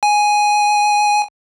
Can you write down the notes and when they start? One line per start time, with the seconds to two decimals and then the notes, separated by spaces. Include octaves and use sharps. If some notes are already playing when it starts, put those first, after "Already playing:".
0.03 G#5